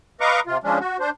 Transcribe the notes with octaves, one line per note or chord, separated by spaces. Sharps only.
B4 D#5 F5 A#5 C#6 D6
C3 F4
F3 G#3 C#4 D4
F#4
D4 C5